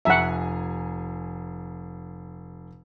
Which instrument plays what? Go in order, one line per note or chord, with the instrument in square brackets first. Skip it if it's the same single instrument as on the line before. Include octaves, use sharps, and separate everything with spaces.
[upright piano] F1 G#5 A#5 [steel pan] E5 F#5